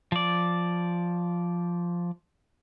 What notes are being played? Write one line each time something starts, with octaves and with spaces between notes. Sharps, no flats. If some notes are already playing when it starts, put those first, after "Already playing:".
F3 D5